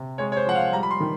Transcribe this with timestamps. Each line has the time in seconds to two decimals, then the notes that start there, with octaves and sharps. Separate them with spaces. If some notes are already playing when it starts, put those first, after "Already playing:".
Already playing: C3
0.18 G#3 C#5
0.32 C#5
0.37 C5
0.46 F3 F#5
0.55 F5
0.72 G3 A#5
0.83 B5
0.91 C6
1.00 D#3